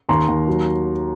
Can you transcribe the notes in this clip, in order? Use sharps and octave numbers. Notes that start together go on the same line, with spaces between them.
D#2 A#5 C6
D#2
F#3